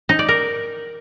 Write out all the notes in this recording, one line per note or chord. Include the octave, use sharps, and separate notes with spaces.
D#4
D5
A#4